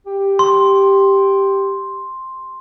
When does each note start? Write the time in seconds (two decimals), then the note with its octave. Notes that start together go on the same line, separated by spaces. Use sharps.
0.06 G4
0.39 C6